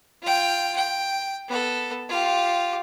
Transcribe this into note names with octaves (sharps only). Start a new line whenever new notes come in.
F4 G5
G5
B3 A4
F4 G4